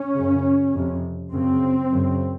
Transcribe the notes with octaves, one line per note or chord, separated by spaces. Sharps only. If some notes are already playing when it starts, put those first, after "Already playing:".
Already playing: C#4
F#2 C#3
F2 C3
F#2 C#3 C4
F#2 C#3